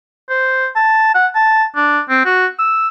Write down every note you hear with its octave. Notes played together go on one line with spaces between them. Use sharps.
C5
A5
F#5
A5
D4
C4
F#4
E6